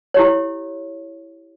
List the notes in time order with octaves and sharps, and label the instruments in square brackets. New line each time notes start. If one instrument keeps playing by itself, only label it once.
[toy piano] E4 G4 C#5